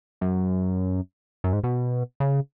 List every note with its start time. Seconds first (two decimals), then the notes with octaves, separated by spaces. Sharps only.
0.21 F#2
1.44 F#2
1.53 G#2
1.64 B2
2.20 C#3